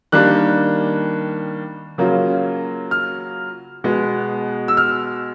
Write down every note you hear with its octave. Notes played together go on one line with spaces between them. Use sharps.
D#3 G3 A#3 D4 F#6
C#3 F#3 A#3 C#4 F4
F6
B2 G#3 B3
E6
F6